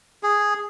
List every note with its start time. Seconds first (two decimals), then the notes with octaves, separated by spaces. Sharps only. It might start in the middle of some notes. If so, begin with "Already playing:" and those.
0.23 G#4